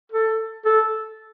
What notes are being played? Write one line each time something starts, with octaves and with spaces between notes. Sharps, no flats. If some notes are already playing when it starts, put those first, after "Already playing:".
A4
A4